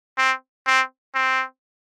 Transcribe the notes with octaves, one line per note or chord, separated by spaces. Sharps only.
C4
C4
C4